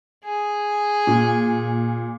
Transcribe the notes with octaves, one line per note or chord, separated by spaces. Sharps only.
G#4
A#2